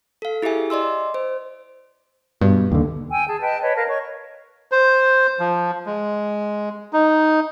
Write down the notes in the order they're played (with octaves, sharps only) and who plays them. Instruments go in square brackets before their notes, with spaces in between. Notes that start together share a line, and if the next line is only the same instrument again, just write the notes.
[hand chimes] A4 F5
E4 G4 G#4 E5 G#5
D5 D#5 C6 E6
C5
[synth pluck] G2 [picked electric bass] B2
[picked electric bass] D#2 D3
[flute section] G5 G#5 E6
G#4 A5
B4 D#5 G5 A5
B4 C#5 D#5
A#4 B4 F5 A5
C#5 D#5 C#6
[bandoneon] C5
F3
G#3
D#4